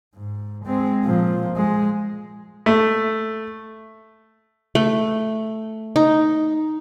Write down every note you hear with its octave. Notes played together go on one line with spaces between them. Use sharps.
G#2
G#3 C4
A#2 F3
G#3
A3
A3
D#4